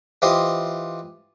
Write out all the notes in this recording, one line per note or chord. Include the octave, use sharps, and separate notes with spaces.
E3 F4 G4 C5 D#5